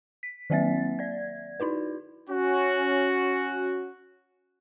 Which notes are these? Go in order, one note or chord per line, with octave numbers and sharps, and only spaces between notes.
B6
D#3 F#3 A#3 C4 E5 A6
D5 G#6
D#4 E4 F#4 B4
C#4 F#4